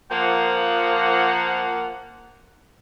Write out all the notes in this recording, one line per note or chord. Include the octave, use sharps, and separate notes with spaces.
F3 A#3 F#5